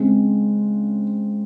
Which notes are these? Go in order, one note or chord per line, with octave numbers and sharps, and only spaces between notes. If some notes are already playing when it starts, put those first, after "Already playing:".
Already playing: C#3 G#3 C4